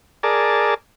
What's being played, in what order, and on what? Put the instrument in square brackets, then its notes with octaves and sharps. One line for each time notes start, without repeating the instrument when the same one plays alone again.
[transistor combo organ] G#4 A#4 D5 A5